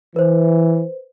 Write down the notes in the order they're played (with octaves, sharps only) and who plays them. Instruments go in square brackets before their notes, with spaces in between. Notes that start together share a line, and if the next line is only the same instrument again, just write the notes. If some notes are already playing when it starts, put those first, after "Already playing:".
[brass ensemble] E3 [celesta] B4 C5